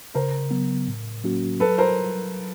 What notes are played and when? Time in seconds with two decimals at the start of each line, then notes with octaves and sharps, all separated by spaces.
0.14 C#3 A#4 C5
0.51 F#3 B3
0.88 A2
1.24 F#3 A#3 C#4 F#4
1.60 F#3 A4 B4
1.78 A#4 C5